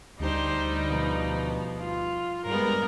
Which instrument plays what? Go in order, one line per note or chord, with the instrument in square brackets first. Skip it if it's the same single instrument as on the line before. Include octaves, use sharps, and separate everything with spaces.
[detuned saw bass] D2 [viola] G3 D#4 [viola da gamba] D4 G4 C5
[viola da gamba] B2 F3
[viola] F4
[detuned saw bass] G2 [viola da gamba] G3 G#3 B3 [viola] A#4